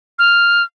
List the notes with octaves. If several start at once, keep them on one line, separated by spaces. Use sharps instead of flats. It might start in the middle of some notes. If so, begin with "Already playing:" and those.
F6